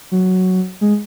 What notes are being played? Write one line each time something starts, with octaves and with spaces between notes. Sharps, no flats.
F#3
G#3